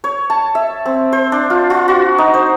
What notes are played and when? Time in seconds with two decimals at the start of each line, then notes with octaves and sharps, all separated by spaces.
0.04 C#5
0.30 A5
0.55 E5
0.86 C4
1.12 C5
1.32 D4
1.50 F4
1.70 F4
1.88 F#4
2.18 D#4
2.34 C5